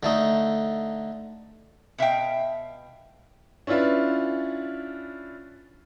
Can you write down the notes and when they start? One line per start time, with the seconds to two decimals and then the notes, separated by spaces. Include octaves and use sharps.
0.03 D3 A3 D#4
1.98 B2 E5 F5 G5
3.67 C#4 D4 E4 F4 B4